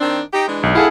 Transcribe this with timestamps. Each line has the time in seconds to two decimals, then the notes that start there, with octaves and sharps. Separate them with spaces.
0.01 D#3 C4 D4
0.33 D#4 G4
0.48 E3 G#3 D4
0.63 B1
0.75 D2 E4 G#4 A4 F5 F#5